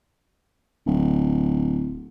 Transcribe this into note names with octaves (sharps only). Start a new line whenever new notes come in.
D1